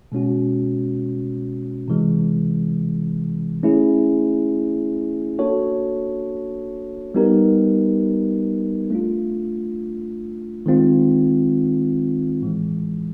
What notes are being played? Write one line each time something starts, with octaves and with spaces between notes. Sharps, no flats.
B2 G#3 C#4 F#4
C3 E3 G#3
A3 C#4 E4 G#4
A#3 D4 F#4 A4 C#5
G3 B3 D#4 G4 A#4
A3 D4 F4
D#3 G#3 C4 F4
A2 E3 G#3